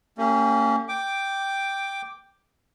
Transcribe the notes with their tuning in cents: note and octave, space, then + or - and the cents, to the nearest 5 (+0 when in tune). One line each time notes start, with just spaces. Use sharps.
A#3 -40 C#4 +0 G4 -5
G5 +0 D6 +0